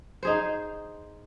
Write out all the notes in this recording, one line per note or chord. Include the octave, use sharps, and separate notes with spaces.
D#4 G#4 C5